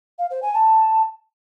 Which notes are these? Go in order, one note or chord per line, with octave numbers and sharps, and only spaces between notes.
F5
C5
G#5
A5